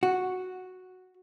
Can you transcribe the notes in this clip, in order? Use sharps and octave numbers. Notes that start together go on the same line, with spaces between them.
F#4